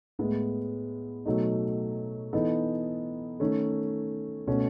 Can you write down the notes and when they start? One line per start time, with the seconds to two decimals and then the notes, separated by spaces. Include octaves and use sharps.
0.19 A2 G#3 B3
1.25 B2 F#3 A3 D#4
2.33 E3 B3 D#4 A4
3.40 D#3 A3 C#4
4.47 B2 A3 C#4